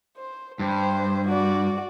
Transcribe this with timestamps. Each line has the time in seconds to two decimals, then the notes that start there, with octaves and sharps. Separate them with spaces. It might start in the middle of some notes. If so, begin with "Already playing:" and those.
0.17 C5
0.59 G2 C5
1.27 F#4 D5